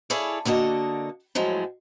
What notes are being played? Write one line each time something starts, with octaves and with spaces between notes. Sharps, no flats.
E4 G#4 A4 C#5 D5 F5
D3 A#3 F#4 D#5 A5
A2 F3 F#3 G#3